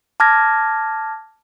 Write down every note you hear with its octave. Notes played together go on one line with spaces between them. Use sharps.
A5 D6 F6 G#6 A#6